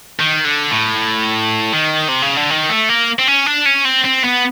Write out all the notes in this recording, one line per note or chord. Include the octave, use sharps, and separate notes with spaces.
D#3
D3
A2
D#3
C3
C#3
D3
D#3
A3
A#3
C4
C#4
D4
C#4
C4
C4
B3